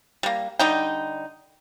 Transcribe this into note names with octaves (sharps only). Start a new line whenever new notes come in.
G3 A#3
D3 G3 D#4 G5